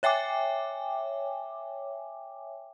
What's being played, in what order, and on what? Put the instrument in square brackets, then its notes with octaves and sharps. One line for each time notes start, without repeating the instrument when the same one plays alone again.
[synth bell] C#5 E5 G5 G#5 D6